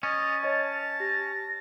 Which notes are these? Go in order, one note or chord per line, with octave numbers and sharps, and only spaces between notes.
C#4 D#5 A6
C#5 D#5 A5
G4 A#6